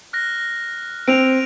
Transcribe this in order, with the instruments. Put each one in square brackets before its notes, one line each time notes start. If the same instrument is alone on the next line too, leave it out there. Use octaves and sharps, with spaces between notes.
[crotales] F6 F#6 A#6
[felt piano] C4 [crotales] D7 D#7 F7